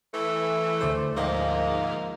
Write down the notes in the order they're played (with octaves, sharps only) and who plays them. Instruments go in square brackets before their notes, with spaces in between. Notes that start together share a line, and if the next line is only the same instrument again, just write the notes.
[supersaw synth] E3 [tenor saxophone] A3
[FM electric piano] D2 D5 C6 [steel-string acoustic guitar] C5
[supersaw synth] G#2 [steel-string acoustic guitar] F3 D#5 G5 [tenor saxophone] A#3